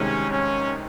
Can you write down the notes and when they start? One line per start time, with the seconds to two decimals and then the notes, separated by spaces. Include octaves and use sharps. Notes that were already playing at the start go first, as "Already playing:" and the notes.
Already playing: C2 C3 D#3 G#3 C#4
0.31 C#4